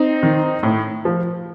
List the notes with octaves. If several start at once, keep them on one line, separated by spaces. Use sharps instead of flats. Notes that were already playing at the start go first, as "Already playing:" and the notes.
Already playing: C4 D#4
D#3
A2
F3